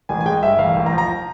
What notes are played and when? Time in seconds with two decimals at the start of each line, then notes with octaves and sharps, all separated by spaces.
0.09 A1 G#5
0.21 G#5
0.26 G#3 G5
0.42 G2 E5
0.59 A1 F5
0.76 A1
0.86 A#5
0.93 F3
0.98 A#5
1.09 F3